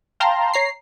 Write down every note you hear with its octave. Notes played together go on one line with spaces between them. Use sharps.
F5 G5 A5 A#5 C6
C#5 A#5 C7